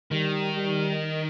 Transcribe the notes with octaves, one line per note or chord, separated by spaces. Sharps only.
D#3 G3
G3